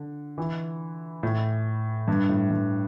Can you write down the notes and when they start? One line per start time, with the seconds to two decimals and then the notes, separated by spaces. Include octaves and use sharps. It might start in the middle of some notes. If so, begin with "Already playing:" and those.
Already playing: D3
0.38 E3
1.23 A2
2.08 G2
2.29 A2
2.50 G2